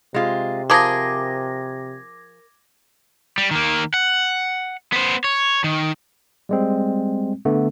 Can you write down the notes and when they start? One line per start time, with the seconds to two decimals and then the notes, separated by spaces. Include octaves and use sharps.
0.14 C3 G#3 F4
0.70 F3 G#4 A#4 D6 G#6 A#6
3.38 G3
3.51 D#3 A#3
3.94 F#5
4.93 B3 C5
5.24 C#5
5.64 D#3
6.49 G3 G#3 C4
7.45 D3 A3 B3